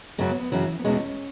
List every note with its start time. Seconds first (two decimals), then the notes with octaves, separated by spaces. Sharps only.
0.18 F#2 C#3 F#3 G#3
0.30 B3
0.40 B3
0.52 F#2 C#3 E3 F#3
0.79 B3
0.85 E2 B2 G#3 C#4